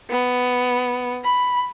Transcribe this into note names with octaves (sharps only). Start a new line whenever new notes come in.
B3
B5